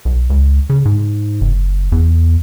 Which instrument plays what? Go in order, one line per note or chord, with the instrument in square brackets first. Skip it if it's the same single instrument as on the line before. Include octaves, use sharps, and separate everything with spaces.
[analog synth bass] B1
C#2
C#3
G#2
F#1
E2